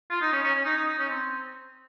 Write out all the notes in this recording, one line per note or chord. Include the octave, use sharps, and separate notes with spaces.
F4
D#4
C#4
C#4
C#4
D#4
D#4
D#4
C#4
C4